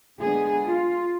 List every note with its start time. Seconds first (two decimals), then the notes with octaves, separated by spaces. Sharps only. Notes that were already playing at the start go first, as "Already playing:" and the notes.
0.21 D3 G#3 B3 D4 G#4
0.66 F4